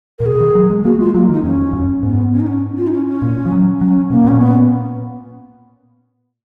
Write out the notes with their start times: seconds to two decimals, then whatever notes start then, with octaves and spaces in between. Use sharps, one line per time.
0.19 A#2 A#4
0.25 B2 G#4
0.40 D#3
0.55 F#3
0.70 G#3
0.85 A#3 F#4
0.99 G#3 F4
1.14 F#3 A#3
1.29 D#3
1.33 D#4
1.43 F2 C#4
1.73 F#2
2.03 G#2 B3
2.33 C#4
2.40 D#4
2.47 C#4
2.77 F4
2.87 D#4
2.92 C#4
3.07 C#4
3.22 A#2
3.46 F3
3.52 F#3
3.81 F#3 C#4
4.10 B2 A#3
4.25 A#2 C#4
4.40 B3